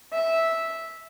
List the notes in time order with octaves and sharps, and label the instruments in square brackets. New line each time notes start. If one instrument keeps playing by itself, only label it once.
[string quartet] E5